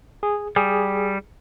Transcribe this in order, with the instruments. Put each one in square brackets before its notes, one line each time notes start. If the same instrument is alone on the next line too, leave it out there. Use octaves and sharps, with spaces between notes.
[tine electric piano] G#4
[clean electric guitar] G3 [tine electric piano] G#4